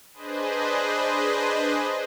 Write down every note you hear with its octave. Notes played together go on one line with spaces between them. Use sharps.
D4 G#4 B4 C5 D#5